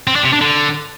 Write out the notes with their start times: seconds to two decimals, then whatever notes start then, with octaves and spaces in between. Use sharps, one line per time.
0.07 C4
0.16 D4
0.24 C3
0.32 D4
0.41 D3